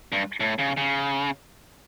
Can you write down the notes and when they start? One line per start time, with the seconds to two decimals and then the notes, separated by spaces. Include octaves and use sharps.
0.12 G2
0.40 A2
0.59 C#3
0.77 C#3